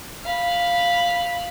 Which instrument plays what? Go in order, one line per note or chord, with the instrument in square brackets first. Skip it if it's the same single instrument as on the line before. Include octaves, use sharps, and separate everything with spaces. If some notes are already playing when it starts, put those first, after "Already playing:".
[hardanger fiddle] F5 B5